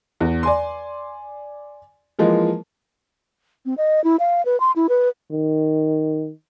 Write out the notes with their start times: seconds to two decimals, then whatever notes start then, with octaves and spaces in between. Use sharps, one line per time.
0.20 E2
0.43 D5 G#5 C6
2.19 E3 F3 G#3 A#3
3.66 C4
3.78 D#5
4.04 E4
4.19 F5
4.45 B4
4.60 C6
4.76 E4
4.89 B4
5.32 D#3